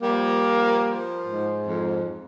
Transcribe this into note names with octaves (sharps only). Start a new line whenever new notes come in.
F3 G3 A#3
F3
F3
G#2
F2